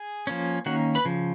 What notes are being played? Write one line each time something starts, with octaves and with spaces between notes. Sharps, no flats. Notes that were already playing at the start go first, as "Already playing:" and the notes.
Already playing: G#4 G#5
F3 A#3 C#4
D#3 A#3 C#4 F#4 F#5
B4 B5
C#3 F3